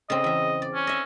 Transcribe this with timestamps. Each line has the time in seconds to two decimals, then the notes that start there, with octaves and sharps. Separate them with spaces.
0.10 C#3 C4 D#5
0.24 E2 E5
0.62 D5
0.75 C#4
0.87 D#5 E5